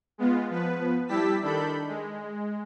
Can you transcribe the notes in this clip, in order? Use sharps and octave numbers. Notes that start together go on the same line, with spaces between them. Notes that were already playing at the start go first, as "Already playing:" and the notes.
G#3 B3 F4
F3 B3 B4
G3 E4 G4 A5 E6 B6
D#3 D4 A4 B5 G6
G#3